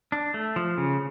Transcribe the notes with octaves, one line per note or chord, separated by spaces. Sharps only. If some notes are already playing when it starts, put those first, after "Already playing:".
D4
A3
F3
C#3